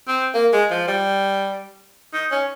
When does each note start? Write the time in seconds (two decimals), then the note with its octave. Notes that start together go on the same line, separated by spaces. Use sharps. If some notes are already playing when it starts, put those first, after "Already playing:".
0.08 C4
0.34 A#3
0.53 G#3
0.71 F3
0.88 G3
2.13 D#4
2.31 C#4